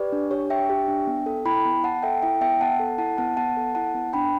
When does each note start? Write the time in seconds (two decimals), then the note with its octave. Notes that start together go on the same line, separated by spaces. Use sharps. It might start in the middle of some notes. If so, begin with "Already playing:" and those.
Already playing: G4 B4 D5
0.12 D4
0.31 G4 C#5
0.50 D4 E5 G5
0.70 G4
0.88 D4
1.07 B3
1.26 A4
1.45 E4 G5 B5
1.65 B3
1.83 B3 F#5 A5
2.03 A4 E5 G5
2.22 E4 E5 G5
2.41 B3 E5 G5
2.61 B3 F#5 A5
2.80 A4
2.98 E4 F#5 A5
3.17 B3 F#5 A5
3.37 B3 F#5 A5
3.57 A4
3.75 E4 F#5 A5
3.94 B3
4.13 D4 G5 B5